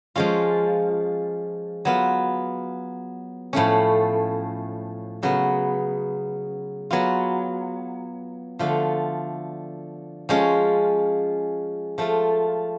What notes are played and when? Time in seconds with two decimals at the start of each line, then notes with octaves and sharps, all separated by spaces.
0.16 F3 G#3 C#4 F4
1.85 F#3 B3 F4
3.53 A2 F3 A3 C#4
5.23 C#3 F#3 B3
6.91 F#3 B3 F4
8.59 D3 F3 A3 F4
10.29 F3 G#3 C#4 F4
11.98 F3 A3 F4